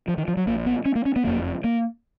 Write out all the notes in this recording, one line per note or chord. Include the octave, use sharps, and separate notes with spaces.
F3
D#3
F3
F#3
A#1 A#2 A#3
B3
C#4
A#3
C#4
B3
F#1 F2 C#3 A#3
A#3